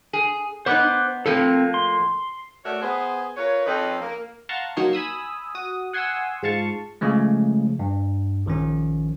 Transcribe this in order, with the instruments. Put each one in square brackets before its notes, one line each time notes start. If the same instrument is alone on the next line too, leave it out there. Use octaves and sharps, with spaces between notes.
[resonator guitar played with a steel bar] G#4
[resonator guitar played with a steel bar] B3 D#4 [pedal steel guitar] C5 D6 F#6
[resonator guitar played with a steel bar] A2 F3 A#3 [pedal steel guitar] C4 A4
[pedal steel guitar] C6
[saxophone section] A3 F#4 A#4 C#5 D5 E5
B3 G#4 C5
F4 A#4 B4 C#5
F3 C4 C#4 D#4 A4 B4
A#3
[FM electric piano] F5 F#5 A5 A#5 C6 C#6
F#3 A#3 D#4 A#4 C#5 C6
G#5 B5 D#6 E6
F#4 D#6
F#5 G#5 C6 C#6 D#6 E6
G#2 F4 F5 A5 C#6
[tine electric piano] C#3 F3 G#3 A3
G2
A#1 D#3 F3 C#4